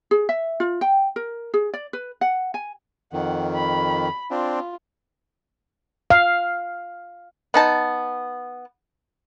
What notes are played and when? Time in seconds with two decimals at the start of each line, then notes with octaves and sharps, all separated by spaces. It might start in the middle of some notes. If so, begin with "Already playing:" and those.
0.11 G#4
0.29 E5
0.60 F4
0.81 G5
1.16 A#4
1.54 G#4
1.74 D5
1.93 B4
2.21 F#5
2.54 G#5
3.13 F2 D#3 F#5
3.53 B5
4.31 C4 D4 F4
6.10 F5
7.54 B3 D#4 A5